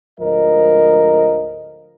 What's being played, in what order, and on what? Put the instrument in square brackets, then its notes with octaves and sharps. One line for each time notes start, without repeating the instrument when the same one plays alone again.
[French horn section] D2 G#2 F3 A#4 D#5